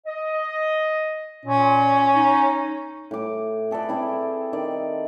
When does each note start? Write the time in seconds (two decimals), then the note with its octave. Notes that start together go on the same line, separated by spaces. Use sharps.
0.06 D#5
1.46 A#2 C#4
2.14 D#4
3.11 A2 D6
3.71 G#4 A4 B4 D5
3.89 C4 E4 D5
4.53 D#3 D5